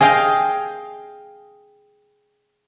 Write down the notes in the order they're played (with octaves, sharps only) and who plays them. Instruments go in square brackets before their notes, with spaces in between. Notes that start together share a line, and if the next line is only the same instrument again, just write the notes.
[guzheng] G#4 D#5 F5 G5